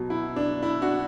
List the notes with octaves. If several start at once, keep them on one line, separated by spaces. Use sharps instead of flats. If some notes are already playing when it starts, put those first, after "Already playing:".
Already playing: B2 F#3
E4
D4
E4
D4 F#4